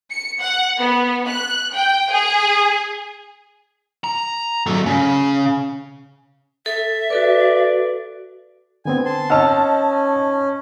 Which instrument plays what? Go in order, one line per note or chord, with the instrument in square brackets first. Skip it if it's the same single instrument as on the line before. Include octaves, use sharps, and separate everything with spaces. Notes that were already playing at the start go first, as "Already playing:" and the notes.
[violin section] C#7
F#5
B3
F#6
G5
G#4
[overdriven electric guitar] A#5
F#3 A3
C#3
[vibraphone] A4 [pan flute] E5
[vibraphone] F#4 A4 B4 [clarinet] D5
[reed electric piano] D3 B3 C4 [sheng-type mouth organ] G#5
[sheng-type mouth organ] A5 C6
[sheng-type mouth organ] C#4 [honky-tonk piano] D#4 A5 [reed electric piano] F#5 E6 F6